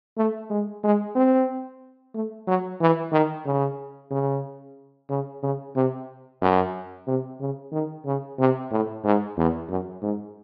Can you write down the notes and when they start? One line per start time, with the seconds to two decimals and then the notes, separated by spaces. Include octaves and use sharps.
0.17 A3
0.50 G#3
0.84 G#3
1.15 C4
2.14 A3
2.47 F#3
2.81 E3
3.12 D#3
3.46 C#3
4.11 C#3
5.10 C#3
5.43 C#3
5.76 C3
6.42 F#2
7.07 C3
7.40 C#3
7.72 D#3
8.05 C#3
8.39 C3
8.71 A2
9.04 G#2
9.37 E2
9.70 F#2
10.02 G#2